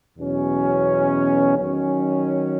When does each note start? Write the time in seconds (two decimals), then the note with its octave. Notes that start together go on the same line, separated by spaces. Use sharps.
0.17 E2 B2 F#3 C#4
1.57 D#3 F#3 C#4